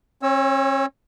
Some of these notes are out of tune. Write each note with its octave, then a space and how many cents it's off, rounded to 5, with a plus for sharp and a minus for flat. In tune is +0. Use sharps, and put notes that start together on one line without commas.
C#4 -45 C#5 +0 E6 +0